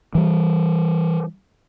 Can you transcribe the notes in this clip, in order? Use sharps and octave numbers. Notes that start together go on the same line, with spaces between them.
E3 G3